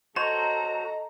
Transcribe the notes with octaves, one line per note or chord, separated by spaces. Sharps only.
F#4 A4 C5 C#5 D#5 A#5